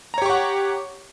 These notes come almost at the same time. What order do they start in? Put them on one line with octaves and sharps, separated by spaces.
A#5 C#5 G4 C#6 F#5